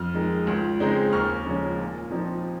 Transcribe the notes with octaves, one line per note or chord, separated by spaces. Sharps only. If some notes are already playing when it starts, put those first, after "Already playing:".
Already playing: F2 F6
D#3 G#3
C#2
C#3 G#3 C4 D#4
D#2 C#6 F6
C#3 F3 G#3 C#4
A#2
F3 C4 D#4